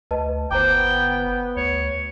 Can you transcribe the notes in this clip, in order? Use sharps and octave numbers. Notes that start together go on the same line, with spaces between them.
D2 B4 D#5 A5
G1 B3 C5 G5 A#5 D6
D2 C#5